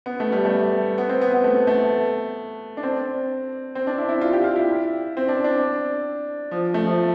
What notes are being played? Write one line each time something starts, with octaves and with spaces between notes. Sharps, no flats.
B3
A3
G3
A3
B3
C4
B3
B3
A3
A3
D4
C4
C4
D4
E4
E4
F4
G4
F4
E4
C4
D4
D4
F3
A3
F3